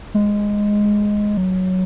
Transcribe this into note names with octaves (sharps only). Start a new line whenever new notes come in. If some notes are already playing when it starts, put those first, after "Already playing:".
G#3
F#3